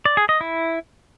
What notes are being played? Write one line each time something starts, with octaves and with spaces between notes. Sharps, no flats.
D5
G#4
D#5
E4